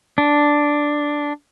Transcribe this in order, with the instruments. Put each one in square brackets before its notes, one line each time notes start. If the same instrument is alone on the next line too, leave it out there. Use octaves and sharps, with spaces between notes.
[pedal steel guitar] D4